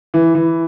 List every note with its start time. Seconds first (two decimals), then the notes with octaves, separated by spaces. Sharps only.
0.14 E3
0.35 E3